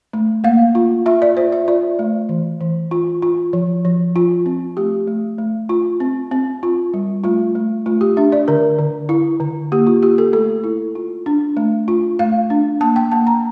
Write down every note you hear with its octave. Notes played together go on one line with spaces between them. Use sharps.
A3
A#3 F5
F4
F4 E5
D5
F4 C5
E5
F4 D5
A3
E3
E3
F4
F4
F3
F3
F4
C4
A3 G4
A3
A3
F4
C4
C4
F4
G3
A3 F4
A3
A3 F4
G4
D4 E5
D5
D3 A#4
D3
E4
D3
A#3 G4
F4
F4 G4
A4
A3 A4
E4
F4
D4
A3
F4
A3 F5
D4
A#3 A5
G5
A#3 A5
A#5